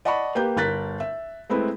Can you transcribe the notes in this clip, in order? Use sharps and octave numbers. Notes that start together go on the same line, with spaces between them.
D5 D#5 F#5 A5 B5 C#6
A#3 G4 B4 G6
G1 A#4 F#6 A6 B6
E5
G#3 A3 C4 E4 B4